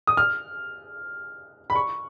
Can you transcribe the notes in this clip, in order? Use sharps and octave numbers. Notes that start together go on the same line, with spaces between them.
D#6
F6
B5
C#6